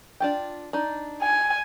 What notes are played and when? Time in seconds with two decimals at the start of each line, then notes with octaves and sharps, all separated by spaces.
0.20 D4 F4 G5
0.73 D4 D#4
1.22 G#5